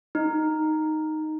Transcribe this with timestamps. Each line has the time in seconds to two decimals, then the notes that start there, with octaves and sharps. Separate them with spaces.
0.15 D#4